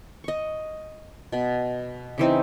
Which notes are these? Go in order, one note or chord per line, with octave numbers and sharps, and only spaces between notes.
D#5 C#6
B2 B5
C#3 E3 C4 D#4